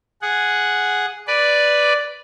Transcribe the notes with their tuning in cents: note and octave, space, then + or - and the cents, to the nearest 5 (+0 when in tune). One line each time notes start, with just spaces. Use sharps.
G#4 +0 F#5 +0
B4 +0 D5 +0